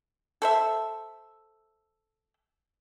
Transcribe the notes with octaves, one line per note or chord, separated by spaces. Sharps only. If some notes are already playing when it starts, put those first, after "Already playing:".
A4 C5 E5